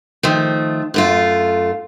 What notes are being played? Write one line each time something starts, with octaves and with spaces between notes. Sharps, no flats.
D#3 F3 A3
F#2 A3 F4